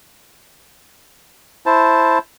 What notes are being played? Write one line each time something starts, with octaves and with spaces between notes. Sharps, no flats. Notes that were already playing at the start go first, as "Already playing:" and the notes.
E4 C5 A5